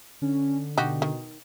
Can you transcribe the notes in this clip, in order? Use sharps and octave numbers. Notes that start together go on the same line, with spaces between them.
D3 C#4
B2 D#4 F#4 G4
D#3